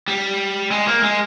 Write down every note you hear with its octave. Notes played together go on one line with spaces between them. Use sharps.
G3
G#3
A#3
G#3